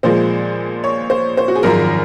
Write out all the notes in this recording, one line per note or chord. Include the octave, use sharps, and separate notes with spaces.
A#1 A#2 F3 G#3 C5
C#5
C5
C5
F#4
G#4
G#1 F#2 F3 G#3 A#4